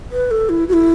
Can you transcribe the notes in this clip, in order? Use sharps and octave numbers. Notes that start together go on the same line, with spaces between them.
B4
A4
E4
F#4
E4